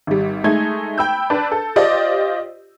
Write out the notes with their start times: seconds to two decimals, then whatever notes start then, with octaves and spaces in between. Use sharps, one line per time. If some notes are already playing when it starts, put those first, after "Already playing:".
0.07 G#1 G3
0.44 G#3 A3 D#4 G#6
0.98 G5 B5 E6 G6
1.30 D4 B4
1.52 A4
1.76 F4 G4 C5 D5 D#5